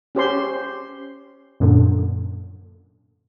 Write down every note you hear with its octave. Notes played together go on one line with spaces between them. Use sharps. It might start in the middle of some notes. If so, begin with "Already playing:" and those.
C#4 G4 C5 C6
F#2 A#2 D3